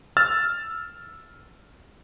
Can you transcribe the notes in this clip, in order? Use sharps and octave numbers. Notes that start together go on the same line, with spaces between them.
E6 F6 A6